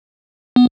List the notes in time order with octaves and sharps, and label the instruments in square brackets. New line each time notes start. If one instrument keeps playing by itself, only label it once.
[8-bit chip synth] B3